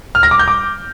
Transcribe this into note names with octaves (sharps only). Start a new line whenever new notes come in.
F6
A#6
D6
G6
D6